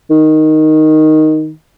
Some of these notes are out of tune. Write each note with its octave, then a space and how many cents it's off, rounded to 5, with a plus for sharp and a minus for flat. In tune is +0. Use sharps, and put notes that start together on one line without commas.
D#3 +0